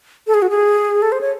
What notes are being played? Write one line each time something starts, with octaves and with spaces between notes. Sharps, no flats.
A4
G#4
F#4
G#4
A4
C5
C#5